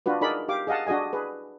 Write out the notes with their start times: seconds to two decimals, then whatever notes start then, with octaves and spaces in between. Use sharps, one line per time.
0.06 D4 F4 F#4 B4
0.21 D#4 G#4 A#4 D5 B5
0.49 G4 F5 D6
0.67 G#4 D#5 F5 F#5 A5
0.87 D4 F#4 G#4 D#5 G#5
1.13 G#4 B4